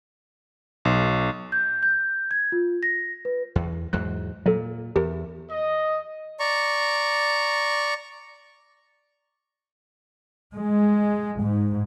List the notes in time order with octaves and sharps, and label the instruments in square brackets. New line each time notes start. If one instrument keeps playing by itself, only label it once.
[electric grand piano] B1
[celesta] G6
G6
G#6
F4
A#6
B4
[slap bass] E2
[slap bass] E2 G#2 F#3 [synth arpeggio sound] F#6
[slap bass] A#2 [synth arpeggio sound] F#3 A4
[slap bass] E2 [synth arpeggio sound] G4 A#4
[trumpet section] D#5
[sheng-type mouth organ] D5 A#5 C#6
[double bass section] G#3
G#2